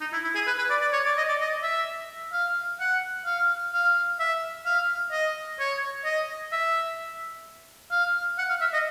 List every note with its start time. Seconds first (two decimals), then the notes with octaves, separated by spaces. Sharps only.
0.01 D#4
0.13 E4
0.24 E4
0.35 G#4
0.47 B4
0.58 B4
0.70 D5
0.81 D5
0.93 C#5
1.05 D5
1.17 D#5
1.28 D5
1.41 D#5
1.63 E5
2.33 F5
2.80 F#5
3.26 F5
3.73 F5
4.19 E5
4.65 F5
5.12 D#5
5.59 C#5
6.05 D#5
6.52 E5
7.91 F5
8.39 F#5
8.49 F5
8.61 E5
8.73 D#5